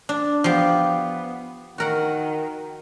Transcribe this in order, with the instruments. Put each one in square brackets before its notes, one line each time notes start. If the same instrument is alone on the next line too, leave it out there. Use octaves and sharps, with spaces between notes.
[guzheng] D4
[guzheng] F3 G4 [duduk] B3
[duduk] D#3 [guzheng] F#4 A#4 F#5